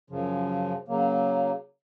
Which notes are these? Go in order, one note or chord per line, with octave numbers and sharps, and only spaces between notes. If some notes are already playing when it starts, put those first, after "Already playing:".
F#2 C#3 F3
C#3 F#3 A#3